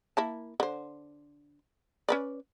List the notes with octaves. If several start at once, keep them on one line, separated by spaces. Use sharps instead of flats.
A#3 E4 A5
D3 C5
C#4 B4 D5